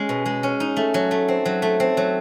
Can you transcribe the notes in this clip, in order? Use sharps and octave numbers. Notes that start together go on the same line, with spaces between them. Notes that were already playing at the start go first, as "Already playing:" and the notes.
Already playing: G#3 C#4
B2
G#3
C#4
D#4
A3
F#3
A3
C4
F#3
A3
C4
F#3